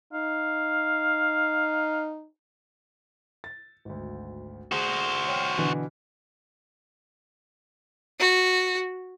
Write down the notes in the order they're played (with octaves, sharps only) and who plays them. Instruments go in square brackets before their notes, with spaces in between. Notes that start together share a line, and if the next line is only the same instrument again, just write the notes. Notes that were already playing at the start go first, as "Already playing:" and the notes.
[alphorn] D#4 [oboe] F5
[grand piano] A6
G#1 D2
[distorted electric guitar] F#4 C5 [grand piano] G#4
[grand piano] C#5 G5 F6
B2 D3 E3
[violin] F#4